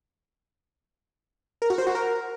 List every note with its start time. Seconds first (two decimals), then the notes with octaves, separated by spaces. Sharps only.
1.62 A#4
1.70 F#4
1.78 C5
1.87 F#4
1.95 A#4